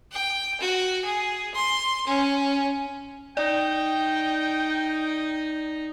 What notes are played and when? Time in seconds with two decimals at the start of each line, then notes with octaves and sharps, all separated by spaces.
0.11 G5
0.60 F#4
1.04 G#4
1.54 C6
2.06 C#4
3.37 D#4 D5 G5